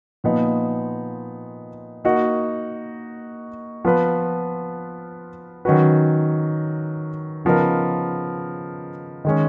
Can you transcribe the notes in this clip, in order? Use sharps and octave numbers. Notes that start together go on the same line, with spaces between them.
A#2 F3 B3 D#4
A#3 D#4 F#4
F3 B3 F4 B4
D#3 F#3 C#4 F#4 B4
C#3 F3 B3 D#4 A#4
D#3 G#3 C#4